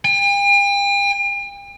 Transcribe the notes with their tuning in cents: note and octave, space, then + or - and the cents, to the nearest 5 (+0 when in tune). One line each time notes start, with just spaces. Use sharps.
G5 +45